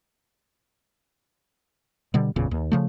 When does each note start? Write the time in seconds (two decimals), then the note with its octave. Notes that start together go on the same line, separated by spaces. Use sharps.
2.14 B2 D3 G3
2.36 G#1 E2 A#2 C#3
2.51 D#2
2.72 C#3 F3 A3